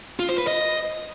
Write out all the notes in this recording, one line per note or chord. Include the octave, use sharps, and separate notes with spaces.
F4
C5
B4
D#5